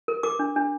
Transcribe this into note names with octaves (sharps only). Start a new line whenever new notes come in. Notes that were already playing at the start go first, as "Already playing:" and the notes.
A#4
A#4 D6
D4
D4